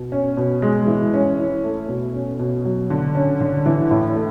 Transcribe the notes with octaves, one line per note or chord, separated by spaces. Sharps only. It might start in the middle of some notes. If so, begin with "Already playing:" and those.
Already playing: B2
C#4
B2
G#3
E3
C#4
E4
A3
B2
C#4
B2
F#3
D3
C#4
D3
E3
A2
A3